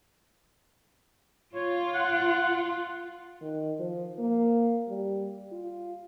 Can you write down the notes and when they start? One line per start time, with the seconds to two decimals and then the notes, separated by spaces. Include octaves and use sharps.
1.55 F4 C#5
1.95 F#5
3.42 D#3
3.79 F3
4.19 A#3
4.89 G3
5.52 F4